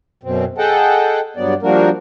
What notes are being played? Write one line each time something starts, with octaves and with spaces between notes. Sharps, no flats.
F#2 B2 C4
G#4 A4 D#5 F#5 G5 A5
G2 F#3 B3 D5
F3 G3 A#3 D4 F#4 A#4